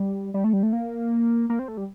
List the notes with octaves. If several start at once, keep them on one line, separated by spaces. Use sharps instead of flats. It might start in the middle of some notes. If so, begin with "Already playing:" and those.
Already playing: G3
G3
A3
G3
A3
A#3
A#3
C4
A3
G3